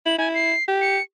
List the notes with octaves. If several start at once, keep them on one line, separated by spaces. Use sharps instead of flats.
E4 F#7
E4 G#5
C7
G4
C#7